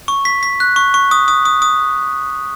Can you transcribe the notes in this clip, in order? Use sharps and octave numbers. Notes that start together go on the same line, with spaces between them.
C#6
B6
B6
F#6
C#6
C#6
D#6
D#6
D#6
D#6